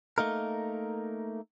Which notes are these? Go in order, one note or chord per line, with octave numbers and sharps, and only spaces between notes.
A3 A#3 D#4 A#4